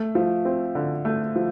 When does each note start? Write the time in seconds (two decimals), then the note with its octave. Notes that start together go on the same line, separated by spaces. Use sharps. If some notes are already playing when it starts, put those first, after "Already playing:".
Already playing: A3
0.15 F3
0.45 C4
0.75 D3
1.05 A3
1.36 F3